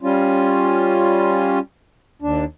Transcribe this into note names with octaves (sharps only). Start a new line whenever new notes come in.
G3 C#4 F4
D#2 D4